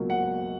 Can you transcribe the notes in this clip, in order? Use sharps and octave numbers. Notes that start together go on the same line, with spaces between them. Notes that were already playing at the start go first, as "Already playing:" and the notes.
Already playing: C#2 B2 F#3 A#3
F#5